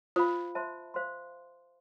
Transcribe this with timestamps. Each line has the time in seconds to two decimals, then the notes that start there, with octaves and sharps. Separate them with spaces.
0.16 F4 C5 F5 B5
0.55 C5 E5 A5 C6
0.94 C5 F5 C6